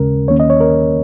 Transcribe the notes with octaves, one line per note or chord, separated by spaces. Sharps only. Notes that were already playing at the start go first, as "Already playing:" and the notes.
Already playing: D#2 C#3 G#3 C#4 A#4
D#2 D#3 A#3 C#4 C#5
D#5
C#5
A#4